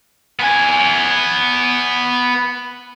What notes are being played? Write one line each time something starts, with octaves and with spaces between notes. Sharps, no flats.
B3 G#5